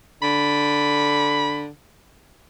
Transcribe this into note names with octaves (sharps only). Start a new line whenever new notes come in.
D3 B5